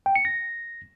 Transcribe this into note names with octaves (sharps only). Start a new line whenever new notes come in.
G5
C#7
A#6